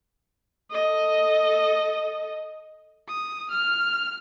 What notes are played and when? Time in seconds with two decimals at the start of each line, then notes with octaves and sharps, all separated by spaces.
0.71 A4 D#5
3.08 D#6
3.51 F6